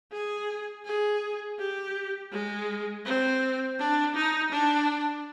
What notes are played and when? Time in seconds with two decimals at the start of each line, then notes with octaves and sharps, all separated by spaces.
0.12 G#4
0.85 G#4
1.58 G4
2.31 G#3
3.05 C4
3.79 D4
4.15 D#4
4.51 D4